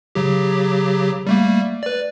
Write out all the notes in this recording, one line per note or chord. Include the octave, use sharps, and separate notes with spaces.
C#3 F#3 G4
G3 A3 A#3
B4 D5